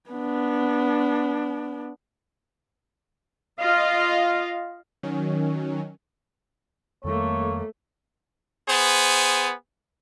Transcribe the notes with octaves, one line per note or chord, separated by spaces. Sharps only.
B3 D4
F4 D#5 F5
D#3 F#3 C#4
F2 D#3 G3 A3 A#3 A4 C#5
B3 G#4 C5